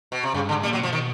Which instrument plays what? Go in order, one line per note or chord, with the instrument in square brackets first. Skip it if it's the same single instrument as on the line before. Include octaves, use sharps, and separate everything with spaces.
[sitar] B2
C3
[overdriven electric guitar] G2 [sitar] C#3
[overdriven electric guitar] G#2 [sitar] D3
[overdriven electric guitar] A#2 [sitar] G3
[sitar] F#3
[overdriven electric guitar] B2
[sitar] F3
D#3